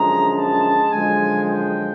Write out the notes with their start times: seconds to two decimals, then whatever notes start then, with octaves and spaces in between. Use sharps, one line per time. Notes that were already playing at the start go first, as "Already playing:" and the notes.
Already playing: F#2 D3 F3 G#3 A#5
0.36 A5
0.91 F#2 D3 F3 G#3 G#5
1.48 G5